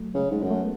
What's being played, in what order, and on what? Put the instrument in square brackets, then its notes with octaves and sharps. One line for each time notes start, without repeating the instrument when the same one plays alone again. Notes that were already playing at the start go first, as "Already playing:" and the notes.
Already playing: [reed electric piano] F#3 A3
[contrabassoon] C#3
G#2
[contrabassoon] F#2 [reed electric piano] G#3
[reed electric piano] A3
B3